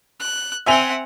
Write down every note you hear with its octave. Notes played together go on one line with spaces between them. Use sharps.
F#6
C4 E5 F#5 G#5 F7